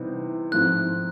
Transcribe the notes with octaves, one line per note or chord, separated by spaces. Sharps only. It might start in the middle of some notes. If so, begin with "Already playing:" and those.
Already playing: C3 E3 G3 B3 D#4
G#2 F3 A3 C4 F#6